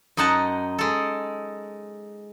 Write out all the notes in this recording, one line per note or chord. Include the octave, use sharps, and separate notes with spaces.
F#2 D#4 D#5 F#5 A5
G#3 A4